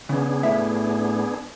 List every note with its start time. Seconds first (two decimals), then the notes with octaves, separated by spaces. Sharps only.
0.09 C#3 B3 D4 G#4
0.43 A2 E5